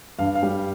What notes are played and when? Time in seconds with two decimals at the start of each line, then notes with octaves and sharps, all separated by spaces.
0.19 G2 F5
0.35 F5
0.43 G3